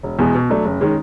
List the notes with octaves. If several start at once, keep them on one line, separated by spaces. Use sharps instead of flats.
E1
E2 B2 G#3 B3
B2
F#3 A3 D4
F#1
D#3 G#3 C#4